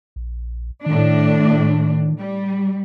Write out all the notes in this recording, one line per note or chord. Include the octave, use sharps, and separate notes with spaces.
A#1
A2 D#3 D4
G3